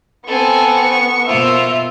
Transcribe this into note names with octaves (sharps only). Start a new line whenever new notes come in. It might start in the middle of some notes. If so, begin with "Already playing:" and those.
B3 C4 A4 G#5 C#6
B2 A#3 F4 C5 E5